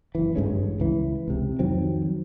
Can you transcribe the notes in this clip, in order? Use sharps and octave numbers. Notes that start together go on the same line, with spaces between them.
F#1 E3
A1 G2 G#3 C#4
C#2 E3
C#2 C3
F2 D#3 F#3 C4